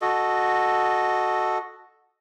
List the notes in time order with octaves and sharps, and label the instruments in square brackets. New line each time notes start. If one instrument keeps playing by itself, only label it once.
[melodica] F#4 A4 D#5